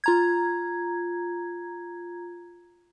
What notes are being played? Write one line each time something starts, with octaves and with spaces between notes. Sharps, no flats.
F4 A#5 G#6